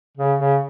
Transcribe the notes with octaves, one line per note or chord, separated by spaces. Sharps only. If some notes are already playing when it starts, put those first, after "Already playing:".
C#3
C#3